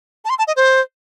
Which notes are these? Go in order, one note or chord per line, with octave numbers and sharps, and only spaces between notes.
A5
C6
A5
D#5
C5